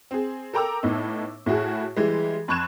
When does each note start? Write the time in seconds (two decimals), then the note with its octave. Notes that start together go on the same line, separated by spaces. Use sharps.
0.11 C4 G#4
0.54 A4 A#4 G5 A#5 D6 E6
0.83 A2 B3 D#4
1.46 A2 E4 F#4 G#4
1.96 E3 G3 G#3
2.48 F2 B5 C#6 F#6 G#6 E7